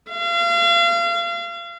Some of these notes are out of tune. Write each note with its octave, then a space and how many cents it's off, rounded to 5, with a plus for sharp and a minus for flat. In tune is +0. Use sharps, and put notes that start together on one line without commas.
F5 -35